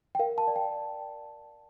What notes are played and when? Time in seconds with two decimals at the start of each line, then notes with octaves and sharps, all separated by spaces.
0.15 G5
0.19 A#4 F5
0.38 A5
0.47 D5
0.56 G5